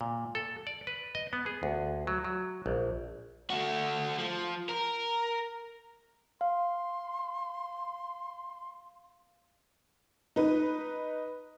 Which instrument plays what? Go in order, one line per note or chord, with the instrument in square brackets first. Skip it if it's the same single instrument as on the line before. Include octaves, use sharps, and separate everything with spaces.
[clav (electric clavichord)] A#2
A4
D5
B4
D#5
B3
G#4
D2
F#3
F#3
A#1
[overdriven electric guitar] A3 F#4
F3
A#4
[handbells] F5 [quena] C6
[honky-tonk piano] D#4 B4